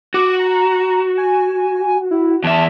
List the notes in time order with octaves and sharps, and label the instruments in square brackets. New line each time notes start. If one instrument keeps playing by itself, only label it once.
[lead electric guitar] F#4 [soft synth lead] D6
[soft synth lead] A#5
G#5
E4
[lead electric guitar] E2 E5 [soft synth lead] A5